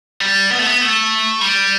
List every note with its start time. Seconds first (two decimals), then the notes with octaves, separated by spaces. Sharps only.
0.21 G3
0.51 B3
0.59 A3
0.66 B3
0.81 A3
1.41 G3